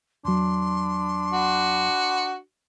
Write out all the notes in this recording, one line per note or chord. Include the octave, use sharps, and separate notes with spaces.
E2 F#3 D4 C6
F#4